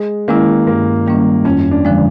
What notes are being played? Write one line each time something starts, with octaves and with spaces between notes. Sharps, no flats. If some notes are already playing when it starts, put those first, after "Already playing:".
Already playing: G#3
D#3 G#3 A#3 C#4 E4
G2 A#3
D#3 G3 A#3 C#4
F2 C#4
D4
D3 F3 G#3